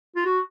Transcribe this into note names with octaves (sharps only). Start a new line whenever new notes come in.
F4
F#4